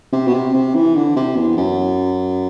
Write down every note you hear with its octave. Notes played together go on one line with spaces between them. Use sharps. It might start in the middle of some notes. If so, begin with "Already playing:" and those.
C3
B2
C3
C3
E3
D3
C3
E2
F#2